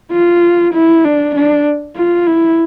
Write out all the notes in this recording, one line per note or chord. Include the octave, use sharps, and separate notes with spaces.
F4
E4
D4
D4
F4
E4